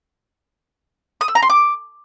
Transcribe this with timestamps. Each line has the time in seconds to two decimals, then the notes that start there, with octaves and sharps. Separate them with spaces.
1.21 D#6
1.28 E6
1.35 A#5
1.42 C6
1.50 D6